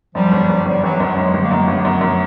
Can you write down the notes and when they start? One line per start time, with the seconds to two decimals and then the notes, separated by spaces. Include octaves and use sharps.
0.15 F#2 F3 G3
0.32 G1
0.49 G1
0.66 G1 F3 G3
0.82 G1 E3 F#3
1.00 F#2 F3 G3
1.17 F#2 F#3 G#3
1.34 G1
1.42 G#3 A#3
1.51 F#2
1.68 G1 A3 B3
1.85 F#2
2.01 F#2